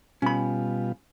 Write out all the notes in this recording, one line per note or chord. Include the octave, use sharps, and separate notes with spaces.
B2 G3 C#4 F4 B5